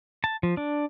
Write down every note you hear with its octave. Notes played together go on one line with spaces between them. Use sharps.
A5
F3
D4